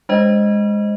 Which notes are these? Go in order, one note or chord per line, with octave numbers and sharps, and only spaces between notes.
G#3 D4 C5 D#5